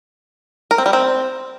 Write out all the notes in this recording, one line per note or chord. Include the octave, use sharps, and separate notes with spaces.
A#4
C4
G3
C4